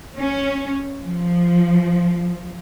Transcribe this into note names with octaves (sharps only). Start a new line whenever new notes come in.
C#4
F3